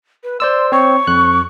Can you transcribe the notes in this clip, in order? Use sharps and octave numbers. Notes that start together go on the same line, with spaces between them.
B4
C5 D5 C6 E6
C4 C#5 C#6
F2 F#6